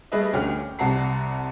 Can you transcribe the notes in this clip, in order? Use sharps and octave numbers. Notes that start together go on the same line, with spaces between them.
G3 A3 G#4 B4 D#5 E5
D2 C#4 G4 G5 F6
G5
C2 C3 F#5 A5 A#5 C7